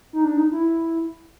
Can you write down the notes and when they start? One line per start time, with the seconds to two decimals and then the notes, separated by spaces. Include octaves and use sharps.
0.13 D#4
0.25 D4
0.37 D#4
0.52 E4